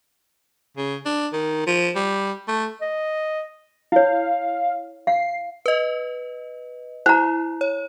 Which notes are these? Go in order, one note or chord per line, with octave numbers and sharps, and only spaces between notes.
C#3
D4
D#3
F3
G3
A3
D#5
E4 C#5 F5
F5 C7
B4 D#5
E4 C5 A#5
C#5